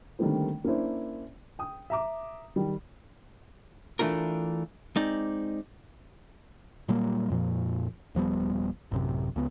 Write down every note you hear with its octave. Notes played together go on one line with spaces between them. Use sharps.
D3 D#3 G3 A3 A#3 C4
A#3 C#4 D4 E4 C5
G5 D#6
E5 A#5 D6
D#3 G3
E3 A3 D4 F4 A#4
G#3 C4 D#4 D5
A#2 F#3 G3 A#3
F2 A#2 F3
D#1 F3 G3 B3
A1 F#2 C3
C#2 B3